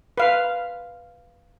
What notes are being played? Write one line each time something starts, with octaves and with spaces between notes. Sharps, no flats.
B4 F5